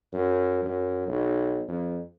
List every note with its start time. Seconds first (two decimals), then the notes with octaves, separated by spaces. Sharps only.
0.13 F#2
0.65 F#2
1.08 B1
1.68 F2